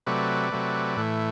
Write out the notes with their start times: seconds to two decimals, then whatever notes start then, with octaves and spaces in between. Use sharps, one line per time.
0.07 C3 F#3 A3 B4 D5
0.52 C3 F#3 A3
0.97 A2 E3 A3